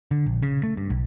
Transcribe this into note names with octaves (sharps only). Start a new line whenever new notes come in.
D3
A#1
C#3
A3
G2
B1